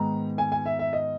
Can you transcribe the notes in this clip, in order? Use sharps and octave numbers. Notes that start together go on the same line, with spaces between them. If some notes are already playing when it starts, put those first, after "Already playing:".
Already playing: G#2 D#3 G#3 B3 D#4 A#5
G#5
G#5
E5
E5
D#5